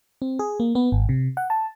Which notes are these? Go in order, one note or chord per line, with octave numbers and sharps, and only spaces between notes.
C4
G#4
A#3
B3
G#1
C3
F#5
A5